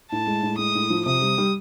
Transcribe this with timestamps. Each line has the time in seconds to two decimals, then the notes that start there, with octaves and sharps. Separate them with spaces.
0.11 A2 A5
0.27 G#3
0.43 A2
0.58 G#3 D#6
0.75 A2
0.90 F3
1.06 C3 D#6
1.21 G3
1.38 G3